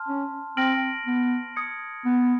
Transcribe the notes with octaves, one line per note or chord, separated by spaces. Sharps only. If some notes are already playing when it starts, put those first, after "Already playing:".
Already playing: A5 C6 F6
C#4
C4 F6 A#6 D7 F#7
B3
D#6 G#6 C#7
B3